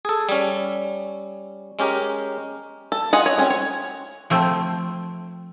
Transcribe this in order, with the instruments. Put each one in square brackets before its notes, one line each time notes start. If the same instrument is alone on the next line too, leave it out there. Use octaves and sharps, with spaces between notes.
[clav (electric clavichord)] G#4 A4
G3 C#4
G#3 C#4 G4 A#4
[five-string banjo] A4
F4 G#4 D#5 F#5
C#5
C4 C#4 F#4
C#5
[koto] F3 A3 C4